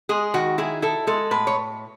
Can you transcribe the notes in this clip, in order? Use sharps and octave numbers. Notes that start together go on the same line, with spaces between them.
G#3 G#4
D#3 F#4
E4 G#4
E4 A4
G#3 A4
A2 B4
C#5